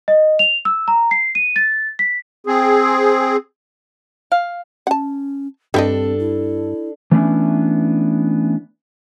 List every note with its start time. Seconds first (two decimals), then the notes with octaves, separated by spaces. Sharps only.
0.08 D#5
0.39 F7
0.65 E6
0.88 A#5
1.11 C7
1.35 D#7
1.56 A6
1.99 B6
2.47 C4 G#4
4.32 F5
4.87 C#4 F#5 A5
5.74 G2 G3 C4 D4 G4 A4 D#5
6.19 E4
7.12 E3 A3 B3 C#4 D4 E4